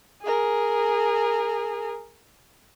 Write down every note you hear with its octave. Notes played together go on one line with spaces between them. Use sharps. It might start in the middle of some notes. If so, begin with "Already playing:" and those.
G#4 A#4